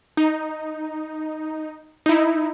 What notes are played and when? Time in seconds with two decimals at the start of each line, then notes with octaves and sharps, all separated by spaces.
0.17 D#4
2.06 D#4 E4